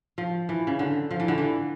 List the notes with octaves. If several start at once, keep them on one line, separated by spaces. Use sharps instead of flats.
F3
E3
C#3
D3
F3
E3
D3
E3